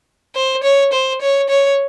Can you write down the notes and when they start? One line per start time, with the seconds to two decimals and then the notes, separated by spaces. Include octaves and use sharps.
0.35 C5
0.63 C#5
0.92 C5
1.21 C#5
1.49 C#5